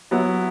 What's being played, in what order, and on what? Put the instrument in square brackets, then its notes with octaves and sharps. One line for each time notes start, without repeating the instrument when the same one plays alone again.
[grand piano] F#3 B3 E4